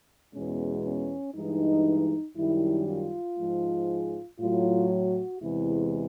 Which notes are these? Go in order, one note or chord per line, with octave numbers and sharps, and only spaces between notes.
E2 B2 G#3 C#4
C#4
G2 E3 G#3 D#4
F#2 D#3 G3 E4
F4
G#2 F3 G#3
A2 F#3 F4
F#4
E2 C3 E3 G#3 E4